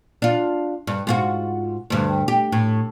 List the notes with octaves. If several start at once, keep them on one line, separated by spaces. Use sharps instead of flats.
D4 F4
G2
G#2 F4 F#4
D2 G2
G4
A2